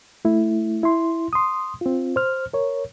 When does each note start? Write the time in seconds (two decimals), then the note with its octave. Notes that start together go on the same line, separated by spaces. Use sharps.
0.25 A3 E4
0.83 E4 C6
1.33 C6 D#6
1.81 C4 F4
2.16 C5 F6
2.53 A#4 C#5